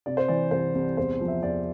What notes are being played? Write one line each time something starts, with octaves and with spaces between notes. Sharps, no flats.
C3 D5
C5
E3 D5
C2 C5
C2
E2 C5
F3
E5
E2 D5